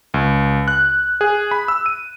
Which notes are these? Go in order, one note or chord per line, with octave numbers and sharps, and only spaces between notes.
C#2
F#6
G#4
B5
E6
D#7